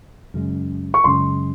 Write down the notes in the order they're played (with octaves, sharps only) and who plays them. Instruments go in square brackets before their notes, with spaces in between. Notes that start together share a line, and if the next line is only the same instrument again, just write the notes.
[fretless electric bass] F#2 C#3 G#3
[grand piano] C#6
[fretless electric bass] F#2 C#3 G#3 [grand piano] C6